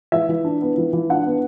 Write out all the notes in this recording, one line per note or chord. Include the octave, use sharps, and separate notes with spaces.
E3 E5
E3
D4
B3
E3
E3
D4 F#5
B3